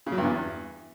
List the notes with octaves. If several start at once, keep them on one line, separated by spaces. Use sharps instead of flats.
C#3
F#3
G2
E2